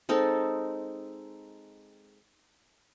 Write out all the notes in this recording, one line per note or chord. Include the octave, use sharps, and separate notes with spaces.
G#3 C4 D#4 A4